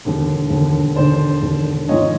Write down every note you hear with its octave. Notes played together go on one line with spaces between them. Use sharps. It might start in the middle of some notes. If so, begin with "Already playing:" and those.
E1 D#2 D3
E1 D#2 D3
E1 D#2 D3 C5 D5
E1 D#2 D3
G#1 G#2 F3 C#5 D#5